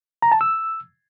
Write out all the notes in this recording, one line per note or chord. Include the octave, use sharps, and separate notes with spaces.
A#5
A5
E6